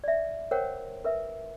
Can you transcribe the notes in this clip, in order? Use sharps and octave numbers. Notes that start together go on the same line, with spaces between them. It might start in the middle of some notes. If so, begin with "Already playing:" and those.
D5 E5
A#4 C5 C#5 F#5 G5
A#4 B4 E5